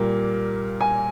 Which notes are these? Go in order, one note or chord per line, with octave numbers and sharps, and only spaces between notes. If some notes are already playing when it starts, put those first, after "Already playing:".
Already playing: A#2 G3 A#3
G#5